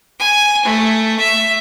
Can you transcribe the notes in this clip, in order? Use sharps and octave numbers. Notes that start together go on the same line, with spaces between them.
G#5
A3
E5